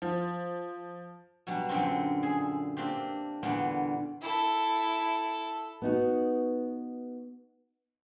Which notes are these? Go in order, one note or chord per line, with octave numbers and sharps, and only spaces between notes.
F3
B2 F#3 G3 D4
F#2 A#2 D3 C4
G#4 E5
A#3 C4 D4 G4
E2 A#2 D3 G3 B3
E4 A4
B3 D#4 F#4